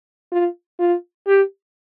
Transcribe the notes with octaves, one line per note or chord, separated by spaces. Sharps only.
F4
F4
G4